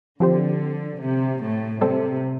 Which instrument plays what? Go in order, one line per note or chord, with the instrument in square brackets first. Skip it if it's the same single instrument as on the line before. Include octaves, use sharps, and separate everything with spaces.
[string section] D3 [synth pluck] F3 C4 G4 C5
[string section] C3
A2
[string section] C3 [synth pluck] G3 C4 A4 C5